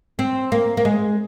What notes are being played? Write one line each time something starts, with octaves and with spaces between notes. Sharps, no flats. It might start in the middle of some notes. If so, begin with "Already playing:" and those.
C4
A#3
A#3
G#3